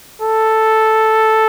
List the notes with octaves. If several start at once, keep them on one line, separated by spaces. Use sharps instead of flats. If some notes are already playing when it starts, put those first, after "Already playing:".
A4